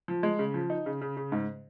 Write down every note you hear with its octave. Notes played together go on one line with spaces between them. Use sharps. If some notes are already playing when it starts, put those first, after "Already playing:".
F3
G#3
C#3
F3
D#4
C#3
C#3
C#3
G#2